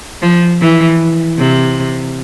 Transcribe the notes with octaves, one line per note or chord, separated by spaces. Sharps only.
F3
E3
C3